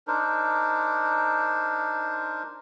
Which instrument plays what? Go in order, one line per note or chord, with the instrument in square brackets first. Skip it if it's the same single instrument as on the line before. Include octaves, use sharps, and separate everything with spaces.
[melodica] D4 D#4 A#4 C5